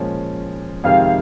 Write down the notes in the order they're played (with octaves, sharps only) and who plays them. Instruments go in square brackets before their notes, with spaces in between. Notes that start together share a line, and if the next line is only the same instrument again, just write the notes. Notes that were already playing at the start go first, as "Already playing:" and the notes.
Already playing: [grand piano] A#2 F3 G#3 C#4
[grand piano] F2 C3 D#3 G#3 [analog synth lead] F5